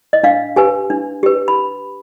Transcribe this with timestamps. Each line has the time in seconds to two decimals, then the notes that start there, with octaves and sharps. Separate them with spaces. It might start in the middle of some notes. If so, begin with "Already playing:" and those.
0.13 D#5
0.23 D4 F5
0.56 G4 B4 G#5
0.90 D4
1.23 G4 B4
1.48 B5